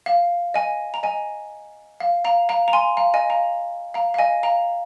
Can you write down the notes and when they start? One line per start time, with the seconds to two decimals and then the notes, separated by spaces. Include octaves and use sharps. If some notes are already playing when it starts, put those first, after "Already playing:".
0.06 F5
0.54 D#5 G#5
0.94 A#5
1.03 D#5 G#5
2.00 F5
2.25 F5 A#5
2.49 F5 A#5
2.68 A#5
2.73 G#5 C6
2.97 F5 A#5
3.14 D#5 G#5
3.30 F5 A#5
3.94 F5 A#5
4.14 F5
4.19 D#5 G#5
4.43 F5 A#5